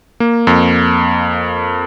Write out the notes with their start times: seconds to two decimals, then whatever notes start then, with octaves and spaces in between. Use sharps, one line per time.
0.20 A#3
0.47 F2